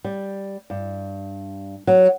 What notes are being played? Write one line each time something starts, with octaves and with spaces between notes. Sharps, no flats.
G3
G2
F#3